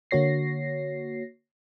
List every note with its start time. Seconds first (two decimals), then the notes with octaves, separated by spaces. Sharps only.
0.11 D3 A#3 F#4 C#5 A#6 C7